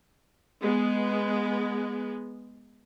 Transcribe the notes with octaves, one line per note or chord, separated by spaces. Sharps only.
G#3 B3